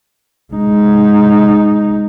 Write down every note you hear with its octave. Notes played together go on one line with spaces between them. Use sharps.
G#3 D#4